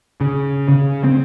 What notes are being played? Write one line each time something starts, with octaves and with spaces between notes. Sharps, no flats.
C#3
C#3
C4